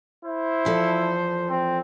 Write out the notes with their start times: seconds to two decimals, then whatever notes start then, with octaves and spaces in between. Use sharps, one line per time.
0.25 E4 C5
0.65 E2 F3 A4
1.50 C4